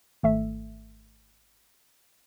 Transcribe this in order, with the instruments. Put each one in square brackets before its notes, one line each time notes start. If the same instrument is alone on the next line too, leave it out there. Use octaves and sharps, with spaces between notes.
[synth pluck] G#1 A3 E5